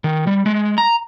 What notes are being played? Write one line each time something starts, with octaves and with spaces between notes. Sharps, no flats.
D#3
G3
G#3
A#5